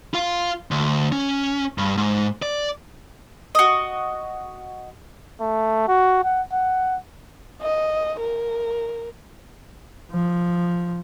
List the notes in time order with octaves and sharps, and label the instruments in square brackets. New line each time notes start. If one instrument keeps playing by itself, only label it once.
[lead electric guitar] F4 F5
D2
C#4
G2
G#2
D5
[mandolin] F#4 D#5
[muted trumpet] A3
F#4
F#5
F#5
[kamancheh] D#5
A#4
[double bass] F3